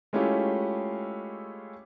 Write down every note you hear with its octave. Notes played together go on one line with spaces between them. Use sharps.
G#3 A3 C#4 E4 F4 G4